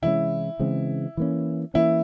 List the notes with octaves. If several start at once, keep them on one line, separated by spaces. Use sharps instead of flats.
C3 E3 G#3 C#4 E4
C#3 E3 G#3 C4
E3 A#3 C#4
E3 A#3 C#4 E4